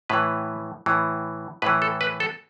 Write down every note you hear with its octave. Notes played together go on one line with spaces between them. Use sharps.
A2 E3 B4
A2 E3
A2 E3 B4
A4
B4
A4